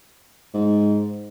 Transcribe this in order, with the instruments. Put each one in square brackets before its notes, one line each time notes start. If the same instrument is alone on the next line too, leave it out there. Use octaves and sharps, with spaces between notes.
[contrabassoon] G#2